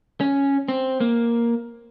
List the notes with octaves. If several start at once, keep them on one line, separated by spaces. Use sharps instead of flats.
C#4
C4
A#3